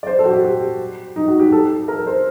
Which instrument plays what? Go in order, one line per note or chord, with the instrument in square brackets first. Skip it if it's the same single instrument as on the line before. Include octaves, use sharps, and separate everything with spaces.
[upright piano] D5
C5
A4
F#4
G4
G4
D#4
F#4
G4
A4
A#4
C5